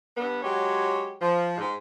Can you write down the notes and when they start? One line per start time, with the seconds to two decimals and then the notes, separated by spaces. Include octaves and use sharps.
0.17 G2 B3
0.42 F#3 G#3 G4 C#5
1.21 F3
1.58 G#2